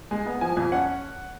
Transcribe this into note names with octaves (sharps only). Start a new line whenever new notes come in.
G#3 G#5
B3
F3 G#5
F2
C#4 F#5